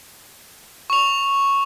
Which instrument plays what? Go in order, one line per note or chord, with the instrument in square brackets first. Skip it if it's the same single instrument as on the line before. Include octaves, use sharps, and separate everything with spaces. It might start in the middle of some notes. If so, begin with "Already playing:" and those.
[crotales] C#6 F7